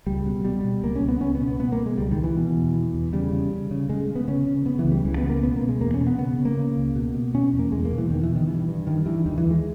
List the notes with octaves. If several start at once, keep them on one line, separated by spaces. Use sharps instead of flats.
C#2 G3
B2
B2 G3
B2
C#2 A#3
C#4
C#2
B3
C#2 C#4
B3
B2
B3
B2 B3
A#3
B2
G#3
C#2 G3
D#3
C#2
E3
B2
E2
E2
E2
C#3 G3
C#3
C#3
C#3
C#3 G#3
C#3
B3
C#3 C#4
C#3
C#3 B3
E3
C#2
G3
C#2 E3
B3
C#3
A#3
B2 B3
A#3
B2
G#3
E2 A#3
C#4
B2
B3
C#3 B3
C#3
A#3
C#3
C#2
B2
B2
B2 C#4
E2
A#3
E2 G#3
A#3
B2
E3
E2 D#3
E3
B2
D#3
G2 E3
G2
G2 D#3
G2 E3
D#2 D#3
E3
D#2
G#3